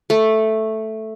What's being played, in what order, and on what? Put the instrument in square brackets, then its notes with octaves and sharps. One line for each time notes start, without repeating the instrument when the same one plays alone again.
[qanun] A3